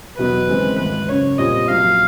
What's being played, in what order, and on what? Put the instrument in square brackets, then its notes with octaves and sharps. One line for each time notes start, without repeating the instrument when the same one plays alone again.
[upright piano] E2 B2 F#3 B3 D#4 [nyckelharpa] B4
[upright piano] D#2 C#3 E3 G#3 C4
[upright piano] G#1 G#2 E3 [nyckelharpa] B4
[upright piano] F#1 F#2 C#3 [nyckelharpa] C#5
[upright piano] A#2 G3 C4 F4 [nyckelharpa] D#5
[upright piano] A#1 A#2 F#3 [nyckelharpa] F5